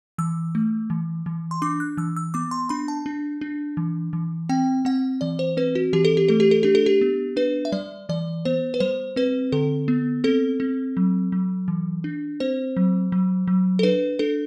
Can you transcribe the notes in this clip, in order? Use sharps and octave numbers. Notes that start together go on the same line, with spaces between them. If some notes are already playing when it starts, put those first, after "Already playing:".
E3 E6
A3
E3
E3
C6
D4 D6
F#6
E3 E6
E6
B3 D6
C6
D4 B5
A5
D4
D4
E3
E3
C4 G5
C4 F#5
E3 D5
C5
C4 B4
F#4
E3 G4
A4
G4
A3 A4
G4
A4
D4 G4
A4
G4
B3
D4 B4
E5
G3 D5
E3 D5
B3 C5
B4
G3 C5
C4 B4
D3 A4
B3
C4 A4
C4
F#3
F#3
E3
D4
C4 C5
F#3
F#3
F#3
A4
D4 B4
D4 A4